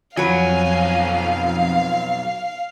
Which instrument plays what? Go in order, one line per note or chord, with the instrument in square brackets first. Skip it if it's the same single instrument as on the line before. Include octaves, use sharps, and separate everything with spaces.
[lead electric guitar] B1 G#5 [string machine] F2 [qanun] F#3 B4 [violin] F5